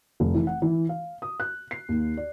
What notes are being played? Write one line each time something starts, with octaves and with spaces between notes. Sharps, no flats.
F1
E3
F#5
E3
F5
D#6
F#6
C7
D#2
D5